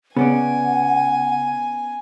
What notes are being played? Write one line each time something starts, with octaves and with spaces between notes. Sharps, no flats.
C#3 B3 C#4 D5 F#5 G#5